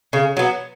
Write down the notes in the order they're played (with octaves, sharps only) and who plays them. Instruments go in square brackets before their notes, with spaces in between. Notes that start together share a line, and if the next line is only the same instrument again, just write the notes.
[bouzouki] C#3
F#3 B3